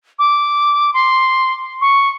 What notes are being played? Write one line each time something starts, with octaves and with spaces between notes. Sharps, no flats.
D6
C6
C#6